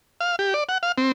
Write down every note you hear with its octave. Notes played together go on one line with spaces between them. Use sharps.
F5
G4
D5
F#5
F5
C4